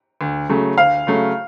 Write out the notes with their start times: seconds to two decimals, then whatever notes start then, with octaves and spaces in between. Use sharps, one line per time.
0.21 D2
0.49 C#3 F#3 A3
0.77 D2 F5
1.07 C#3 F#3 A3